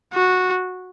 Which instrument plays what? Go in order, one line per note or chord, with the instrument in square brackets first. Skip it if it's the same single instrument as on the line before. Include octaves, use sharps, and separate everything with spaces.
[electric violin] F#4